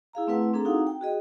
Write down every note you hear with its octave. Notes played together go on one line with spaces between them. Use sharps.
E4 G#4 F5 A#5
A3 C4 E4 B4 F#5
C4 D4 G#4 A4 A#5
D#4 E4 F#4 F5 F#5
G5
F#4 G#4 D#5